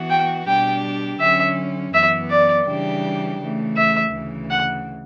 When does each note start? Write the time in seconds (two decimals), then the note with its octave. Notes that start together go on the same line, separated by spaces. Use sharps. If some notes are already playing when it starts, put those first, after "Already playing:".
Already playing: E3 B3 F#4
0.10 G5
0.47 B2 G3 D4 G4 G5
1.20 D3 F#3 C#4 E5
1.93 F#2 E3 B3 E5
2.30 D5
2.67 C#3 E3 G3 D4 G4
3.40 C#3 E3 A3
3.77 E5
4.13 D2 C#3 E3
4.50 F#5